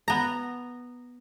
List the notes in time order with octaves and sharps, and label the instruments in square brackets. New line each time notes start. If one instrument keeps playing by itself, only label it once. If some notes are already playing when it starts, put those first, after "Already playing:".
[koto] B3 A#5